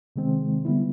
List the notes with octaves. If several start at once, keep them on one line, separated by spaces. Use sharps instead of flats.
C3 D#3 G#3 C4
D3 G3 B3 E4